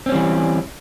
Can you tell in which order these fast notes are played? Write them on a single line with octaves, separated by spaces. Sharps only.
C4 C#4 G3 E3